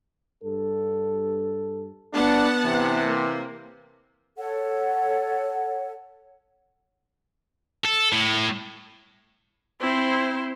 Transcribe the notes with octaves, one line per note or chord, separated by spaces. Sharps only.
G2 A4
B3 D4 F#5 A5
C3 E3
A#3
A4 C#5 F#5
A4
A2
C4 E4 C5